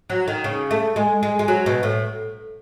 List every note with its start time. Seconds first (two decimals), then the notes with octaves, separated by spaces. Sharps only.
0.10 F#3
0.28 D#3
0.44 C#3
0.71 A3
0.96 G#3
1.23 G#3
1.39 G#3
1.48 F#3
1.66 B2
1.83 A2